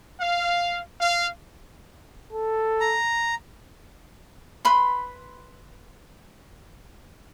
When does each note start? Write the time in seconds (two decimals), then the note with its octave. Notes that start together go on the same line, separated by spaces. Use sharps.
0.20 F5
1.00 F5
2.33 A4
2.80 A#5
4.65 B4 B5 C6